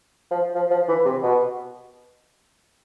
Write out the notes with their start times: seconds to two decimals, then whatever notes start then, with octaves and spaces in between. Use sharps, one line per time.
0.31 F3
0.55 F3
0.71 F3
0.88 E3
1.05 C3
1.23 B2